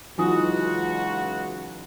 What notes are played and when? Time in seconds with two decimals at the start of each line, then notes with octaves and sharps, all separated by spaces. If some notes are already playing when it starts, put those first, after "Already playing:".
0.18 C#2 E3 F#3 D#4 F4 F#4 G#5 D#6